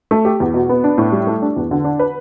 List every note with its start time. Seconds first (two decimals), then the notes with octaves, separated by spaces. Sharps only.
0.11 A3
0.25 G4
0.40 E2
0.54 B2
0.69 B3
0.84 D4
0.98 A2
1.12 G3
1.27 A3
1.42 D4
1.56 E2
1.71 D3
1.84 D4
1.99 B4